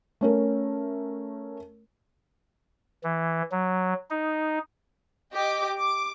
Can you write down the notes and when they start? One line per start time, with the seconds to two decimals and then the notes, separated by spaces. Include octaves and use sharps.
0.21 A3 C#4 A#4
3.04 E3
3.51 F#3
4.10 D#4
5.34 G4 D#5 D6
5.78 D6